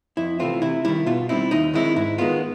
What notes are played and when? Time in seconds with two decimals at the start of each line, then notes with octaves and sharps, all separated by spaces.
0.17 F2 E4
0.40 C3 E3 A3 C4 F4
0.62 C3 E4
0.85 D#3 G3 E4
1.06 B2 F4
1.29 G3 C4 D#4 E4
1.51 D#2 D#4
1.74 D#3 G#3 C4 D#4 E4
1.96 G#2 E4
2.18 D#3 G#3 B3 F4